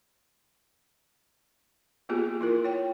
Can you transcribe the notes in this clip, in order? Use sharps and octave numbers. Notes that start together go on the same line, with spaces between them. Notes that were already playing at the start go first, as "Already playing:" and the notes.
A#3 B3 F4 G4 G#4
E4 F4 A#4
C#5 G5